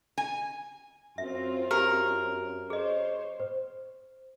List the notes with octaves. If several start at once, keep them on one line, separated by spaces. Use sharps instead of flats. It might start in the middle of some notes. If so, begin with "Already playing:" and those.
G#5
F#2 C4 F4 F#4 E5
G4 A#4
G#4 C5 C#5 D#5
C5